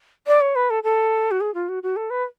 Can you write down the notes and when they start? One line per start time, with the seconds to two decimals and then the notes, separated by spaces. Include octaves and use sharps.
0.27 D5
0.41 C#5
0.56 B4
0.70 A4
0.83 A4
1.31 F#4
1.41 G#4
1.54 F4
1.69 F#4
1.83 F#4
1.96 A4
2.10 B4